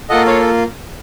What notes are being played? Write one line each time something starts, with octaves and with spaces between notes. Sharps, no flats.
A#3 F4 A4 D#5 F#5
C#5 F5